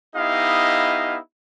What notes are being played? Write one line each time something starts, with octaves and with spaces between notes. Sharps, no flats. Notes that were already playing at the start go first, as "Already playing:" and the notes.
B3 D#4 E4 G4 D#5 F5